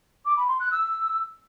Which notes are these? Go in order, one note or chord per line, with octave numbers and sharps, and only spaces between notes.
D6
B5
C6
F#6
E6